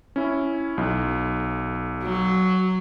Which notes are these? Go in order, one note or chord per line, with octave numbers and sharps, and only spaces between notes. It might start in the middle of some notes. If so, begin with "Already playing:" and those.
C#4 E4
B1
F#3